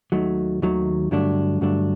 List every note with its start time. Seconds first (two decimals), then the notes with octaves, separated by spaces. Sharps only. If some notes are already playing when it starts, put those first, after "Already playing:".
0.12 D#2 D#3 F#3 A3
0.62 D#2 D#3 F#3 A3
1.11 G2 D3 F#3 A3 D4
1.61 G2 D3 F#3 A3 D4